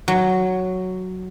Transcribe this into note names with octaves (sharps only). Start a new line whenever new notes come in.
F#3